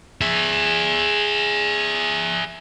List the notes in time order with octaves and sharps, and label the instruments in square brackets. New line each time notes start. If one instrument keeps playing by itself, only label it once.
[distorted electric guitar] G#4 E5